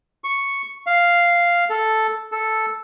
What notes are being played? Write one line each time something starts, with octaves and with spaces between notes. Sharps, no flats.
C#6
F5
A4
A4